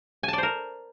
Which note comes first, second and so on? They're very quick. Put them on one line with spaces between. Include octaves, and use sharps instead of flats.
G#5 A5 D5 C5 A#4